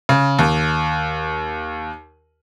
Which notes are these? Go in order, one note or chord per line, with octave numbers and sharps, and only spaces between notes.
C#3
D#2